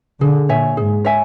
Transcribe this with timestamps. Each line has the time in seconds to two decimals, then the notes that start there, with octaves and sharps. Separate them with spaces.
0.21 D3 G#4
0.49 A#2 C#5 E5 G#5
0.77 G#2 G#4
1.05 C#5 E5 G#5